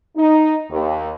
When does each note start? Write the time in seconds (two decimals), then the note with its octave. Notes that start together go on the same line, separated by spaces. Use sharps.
0.17 D#4
0.70 D#2